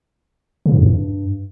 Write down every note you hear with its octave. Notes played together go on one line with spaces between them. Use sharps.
C#3
G#2
F2
G2